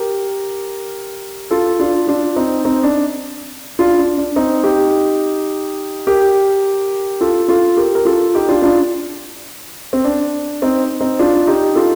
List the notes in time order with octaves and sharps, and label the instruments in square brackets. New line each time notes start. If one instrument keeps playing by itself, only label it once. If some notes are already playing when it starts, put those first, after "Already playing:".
Already playing: [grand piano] G4 A#4
F4 A4
D4 F4
D4 F4
C4 D#4
C4 D#4
D4
D4 F4
D4
D4
C4 D#4
D#4 G4
G4 A#4
F4 A4
F4 A4
G4 A#4
A#4
F4 A4
D#4 G4
D4 F4
D4 F4
C4
D4
C4 D#4
C4 D#4
D4 F4
D#4 G4
F4 A4